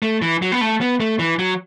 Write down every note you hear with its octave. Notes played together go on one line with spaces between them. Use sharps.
A3
E3
F#3
B3
A3
B3
A3
E3
F#3